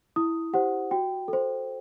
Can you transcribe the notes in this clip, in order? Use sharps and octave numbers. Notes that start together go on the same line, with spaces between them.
E4 D#6
G4 C5 F#5
F#4 G5
A4
C5